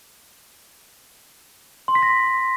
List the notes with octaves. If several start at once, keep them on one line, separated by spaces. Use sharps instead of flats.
C6
B6
A#6